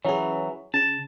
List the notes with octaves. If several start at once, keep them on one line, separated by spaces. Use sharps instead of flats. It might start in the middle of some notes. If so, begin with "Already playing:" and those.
E3 F#3 C#4 G#4
C#3 A5